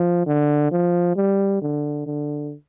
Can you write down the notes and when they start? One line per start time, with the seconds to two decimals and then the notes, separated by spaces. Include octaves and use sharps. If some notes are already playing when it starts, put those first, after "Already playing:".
Already playing: F3
0.27 D3
0.72 F3
1.16 G3
1.62 D3
2.06 D3